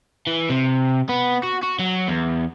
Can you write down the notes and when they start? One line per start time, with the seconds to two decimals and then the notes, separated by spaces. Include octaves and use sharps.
0.27 E3
0.50 C3
1.09 B3
1.43 F#4
1.63 F#4
1.79 F#3
2.08 E2